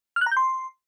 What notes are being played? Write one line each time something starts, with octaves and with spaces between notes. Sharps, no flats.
F6
F#6
A#5
G6
C6